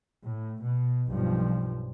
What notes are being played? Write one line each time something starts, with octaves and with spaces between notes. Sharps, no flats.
A2
B2
B1 G2 F3